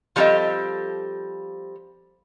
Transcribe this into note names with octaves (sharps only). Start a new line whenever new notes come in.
F3 G3 C4 G4 A4 D#5